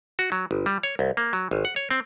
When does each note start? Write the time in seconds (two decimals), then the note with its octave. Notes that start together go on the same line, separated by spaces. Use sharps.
0.19 F#4
0.32 F#3
0.51 G1
0.66 G3
0.83 C#5
0.99 C2
1.17 A#3
1.33 F#3
1.51 G#1
1.65 F#5
1.76 C#5
1.91 C4